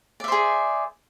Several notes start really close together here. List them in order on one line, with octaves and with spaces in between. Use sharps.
D5 E5 C5 G#4